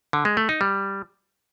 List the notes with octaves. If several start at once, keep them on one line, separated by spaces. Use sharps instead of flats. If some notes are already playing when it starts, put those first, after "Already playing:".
D3
G#3
A3
D#4
G3